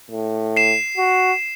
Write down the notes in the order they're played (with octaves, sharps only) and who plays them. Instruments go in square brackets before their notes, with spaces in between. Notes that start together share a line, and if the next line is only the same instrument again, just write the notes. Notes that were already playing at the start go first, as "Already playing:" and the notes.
[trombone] A2
[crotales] C7 E7
[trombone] F#4